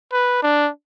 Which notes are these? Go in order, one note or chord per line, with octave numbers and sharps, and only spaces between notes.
B4
D4